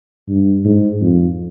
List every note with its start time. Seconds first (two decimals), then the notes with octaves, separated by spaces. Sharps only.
0.29 G2
0.65 G#2
1.01 F2